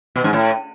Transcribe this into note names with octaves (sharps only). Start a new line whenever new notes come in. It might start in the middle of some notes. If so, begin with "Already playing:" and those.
B2
G#2
A2